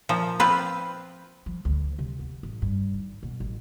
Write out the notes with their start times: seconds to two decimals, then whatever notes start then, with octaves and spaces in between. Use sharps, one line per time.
0.09 A#2 F3
0.40 C4 F4 B4
1.46 F3
1.65 D2
1.99 C3
2.19 B3
2.43 A1
2.62 G2
2.94 G#1
3.23 B2
3.40 A1